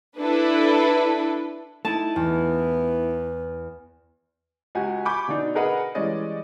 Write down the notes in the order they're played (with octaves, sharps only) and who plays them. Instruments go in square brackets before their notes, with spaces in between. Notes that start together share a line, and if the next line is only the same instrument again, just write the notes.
[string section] D4 E4 A4 B4
[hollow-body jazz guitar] A3 D#4 E4 [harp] A5
[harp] E2 [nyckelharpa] B3
[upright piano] C#2 F#4 G4 G#5
G#5 B5 C#6 D6 G6
B2 D3 D4 D#4
G#4 A#4 B4 D#5 F#5
E3 G3 G#3 C#4 D5 D#5